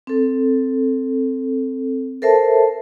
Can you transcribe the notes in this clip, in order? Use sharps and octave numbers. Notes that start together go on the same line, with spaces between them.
C4 A4
A4 A#4 C5 E5 A5